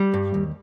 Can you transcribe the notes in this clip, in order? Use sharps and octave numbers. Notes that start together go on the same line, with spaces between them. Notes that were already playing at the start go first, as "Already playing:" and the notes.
Already playing: G3
G2
D#2